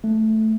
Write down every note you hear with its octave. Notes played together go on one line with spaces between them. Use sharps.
A3